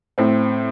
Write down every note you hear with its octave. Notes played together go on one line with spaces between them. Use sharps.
A2 C4